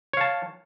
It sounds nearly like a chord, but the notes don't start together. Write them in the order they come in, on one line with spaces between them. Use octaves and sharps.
C#5 F5 A5